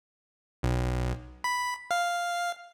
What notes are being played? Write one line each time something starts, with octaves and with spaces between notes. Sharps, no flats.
B1
B5
F5